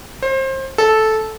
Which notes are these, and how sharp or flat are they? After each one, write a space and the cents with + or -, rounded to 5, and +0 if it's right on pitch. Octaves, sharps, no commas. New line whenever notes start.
C5 +30
A4 -10